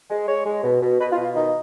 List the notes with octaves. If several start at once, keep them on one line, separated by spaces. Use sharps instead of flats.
G#3
G#3 C#5
G#3
B2
B2
B2 B4
F4
B2
F4
D#3 D#4